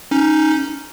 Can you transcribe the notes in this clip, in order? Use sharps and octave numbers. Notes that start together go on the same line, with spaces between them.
C#4 D#4